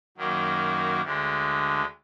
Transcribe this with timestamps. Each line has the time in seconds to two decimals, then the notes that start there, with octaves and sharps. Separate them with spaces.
0.17 F#2 D#3 F#3 A#3
1.02 D2 D3 G#3